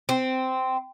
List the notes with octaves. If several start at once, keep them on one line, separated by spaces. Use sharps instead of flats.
C4